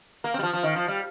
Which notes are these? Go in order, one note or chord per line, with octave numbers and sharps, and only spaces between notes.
A#3
C4
G3
F3
F3
D#3
F3
G3